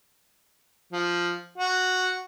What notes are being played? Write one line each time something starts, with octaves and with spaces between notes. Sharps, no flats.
F3
F#4